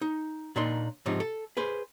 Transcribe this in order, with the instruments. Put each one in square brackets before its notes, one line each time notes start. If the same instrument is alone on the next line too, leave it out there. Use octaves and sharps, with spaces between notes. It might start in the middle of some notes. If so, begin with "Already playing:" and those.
[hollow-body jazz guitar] D#4
A#2 D4 D#4 C6
G#2 C3 F3 D#4
A4
G#4 B4 C5